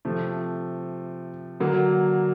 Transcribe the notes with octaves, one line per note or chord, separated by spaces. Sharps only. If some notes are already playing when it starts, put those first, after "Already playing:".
C3 F3 A3
D3 F#3 A#3